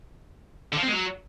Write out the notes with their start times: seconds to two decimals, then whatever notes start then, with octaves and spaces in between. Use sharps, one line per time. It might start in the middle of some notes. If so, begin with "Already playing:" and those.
0.73 D3
0.78 F3
0.83 C4
0.88 G#3
0.93 F#3